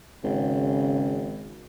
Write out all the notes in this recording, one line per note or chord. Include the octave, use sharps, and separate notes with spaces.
G#1 C#3